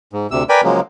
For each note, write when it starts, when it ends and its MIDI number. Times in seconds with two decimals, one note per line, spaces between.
0.13 0.27 44
0.31 0.43 38
0.31 0.43 48
0.31 0.43 88
0.49 0.61 70
0.49 0.61 71
0.49 0.61 74
0.49 0.61 79
0.49 0.61 80
0.49 0.61 83
0.64 0.80 49
0.64 0.80 53
0.64 0.80 54
0.64 0.80 56
0.64 0.80 58